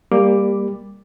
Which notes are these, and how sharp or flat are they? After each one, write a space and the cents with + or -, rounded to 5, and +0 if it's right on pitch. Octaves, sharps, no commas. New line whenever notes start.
G3 +20 A#3 +0 D6 +0